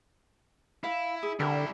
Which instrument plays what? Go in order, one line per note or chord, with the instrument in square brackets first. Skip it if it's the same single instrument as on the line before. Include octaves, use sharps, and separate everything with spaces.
[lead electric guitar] E4 [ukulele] F5
[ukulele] G#4
[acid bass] D3 [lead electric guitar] G3 E4 [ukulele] G4 A#4